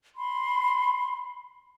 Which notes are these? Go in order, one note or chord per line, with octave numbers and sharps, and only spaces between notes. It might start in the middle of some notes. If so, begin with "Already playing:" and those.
B5 C6